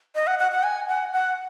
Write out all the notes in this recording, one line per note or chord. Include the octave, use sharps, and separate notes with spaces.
D#5
F#5
F#5
F#5
G#5
F#5
F#5